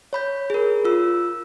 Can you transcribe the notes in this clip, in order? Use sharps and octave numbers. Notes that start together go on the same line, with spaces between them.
C#5 B5 G6
G#4 A#4
F4 E6